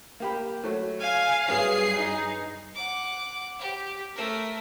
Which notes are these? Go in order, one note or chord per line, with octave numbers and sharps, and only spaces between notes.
A#3 G4 B5
F#3 A3
F5 G#5
G2 F#3 B3 G#4 C7
D#4
F#5 D6
G4
A3 A#4